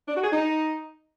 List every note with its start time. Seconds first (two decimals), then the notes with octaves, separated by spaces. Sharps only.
0.08 D4
0.16 F#4
0.24 G#4
0.32 D#4